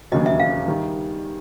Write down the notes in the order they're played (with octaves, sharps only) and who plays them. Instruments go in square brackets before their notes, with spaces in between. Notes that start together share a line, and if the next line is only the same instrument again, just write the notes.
[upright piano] E1 D#2 C#3 F#3 [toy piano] D#5
[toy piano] E5
F5
[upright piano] D#3 G3